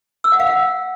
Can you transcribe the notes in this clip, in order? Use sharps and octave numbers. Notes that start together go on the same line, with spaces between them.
E6
F#5
F5
F#5